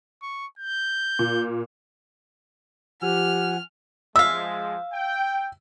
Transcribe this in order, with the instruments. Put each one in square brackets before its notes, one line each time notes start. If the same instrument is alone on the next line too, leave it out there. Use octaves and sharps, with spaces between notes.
[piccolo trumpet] C#6
G6
[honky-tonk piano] A#2
[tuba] F3 [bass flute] G4 [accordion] F#5 G#5 [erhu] F6
[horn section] F3 G#3 [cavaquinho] E5 F5 [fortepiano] E6
[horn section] G5